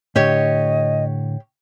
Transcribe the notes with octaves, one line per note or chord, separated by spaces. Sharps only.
A2 D3 G4 C#5 D#5